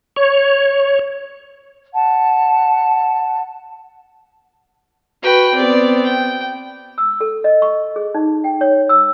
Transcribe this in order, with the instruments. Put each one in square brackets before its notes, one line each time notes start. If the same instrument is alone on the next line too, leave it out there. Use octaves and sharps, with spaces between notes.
[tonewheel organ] C#5
[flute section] F#5 A5
[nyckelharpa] F#4 [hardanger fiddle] B4 G5
[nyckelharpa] B3 C4 [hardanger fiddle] D5
[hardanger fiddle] G5
[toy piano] E6
A4
D#5
C#6
G#4
D#4
G5
C#5
E6